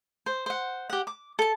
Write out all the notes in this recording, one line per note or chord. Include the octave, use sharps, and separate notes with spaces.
C5
C5 F#5
G4 F#5
D6
A4 A5